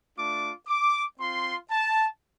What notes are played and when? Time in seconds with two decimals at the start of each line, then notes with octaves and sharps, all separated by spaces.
0.17 A3 D4 F4 D6
0.68 D6
1.19 C4 F4 C6
1.70 A5